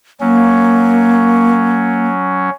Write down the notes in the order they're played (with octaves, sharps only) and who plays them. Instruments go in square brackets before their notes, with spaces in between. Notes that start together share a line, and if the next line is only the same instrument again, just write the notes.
[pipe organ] F#3 C#4 [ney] A#3